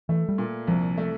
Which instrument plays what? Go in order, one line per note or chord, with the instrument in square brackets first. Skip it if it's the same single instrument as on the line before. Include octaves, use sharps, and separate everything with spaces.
[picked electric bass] E3 [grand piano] A3
[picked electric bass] G3
[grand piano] A#2
[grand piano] C2 [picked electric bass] F3
[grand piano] A3